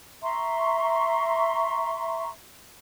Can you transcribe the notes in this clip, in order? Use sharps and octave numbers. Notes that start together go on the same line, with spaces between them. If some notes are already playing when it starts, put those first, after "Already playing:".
E5 A#5 C6 C#6